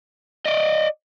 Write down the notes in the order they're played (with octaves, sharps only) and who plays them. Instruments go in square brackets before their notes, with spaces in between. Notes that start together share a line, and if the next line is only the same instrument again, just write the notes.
[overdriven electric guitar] D5 D#5